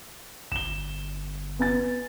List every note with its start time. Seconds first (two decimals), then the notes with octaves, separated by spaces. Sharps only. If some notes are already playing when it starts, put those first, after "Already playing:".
0.52 G1 E7 G7
1.59 B3 G#5 A6